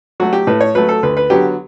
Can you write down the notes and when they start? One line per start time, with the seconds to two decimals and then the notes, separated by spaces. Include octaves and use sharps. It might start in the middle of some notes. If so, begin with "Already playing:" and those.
0.20 F#3 A3 F#4
0.33 G4
0.47 A2 B4
0.61 C#5
0.75 F#3 A3 B4
0.89 A4
1.03 D2 B4
1.17 B4
1.30 D3 F#3 B3 G4